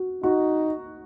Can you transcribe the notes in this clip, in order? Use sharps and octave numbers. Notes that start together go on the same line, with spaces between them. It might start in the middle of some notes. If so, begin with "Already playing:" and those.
Already playing: F#4
D#4 F#4